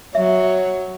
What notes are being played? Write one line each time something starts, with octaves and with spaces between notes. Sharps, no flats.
F#3 C#5 E5